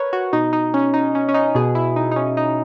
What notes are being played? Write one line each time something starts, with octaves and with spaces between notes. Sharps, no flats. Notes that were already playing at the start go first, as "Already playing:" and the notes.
Already playing: A#4 B4 C#5
F#4
B2 D#4
D#4
C#4
D#4
C#4
C#4
D#4
B2 G#4
E4
D#4
D#4
C#4
D#4